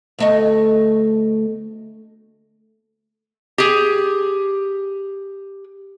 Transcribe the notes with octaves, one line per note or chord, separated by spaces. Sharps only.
D2 A3 D#5
G4 G#4